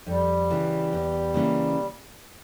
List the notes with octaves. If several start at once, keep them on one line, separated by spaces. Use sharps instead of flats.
F2 G3
C#3 E3
E2
C#3 E3 A#3 C#4